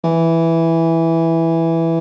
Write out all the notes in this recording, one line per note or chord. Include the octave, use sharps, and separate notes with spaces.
E3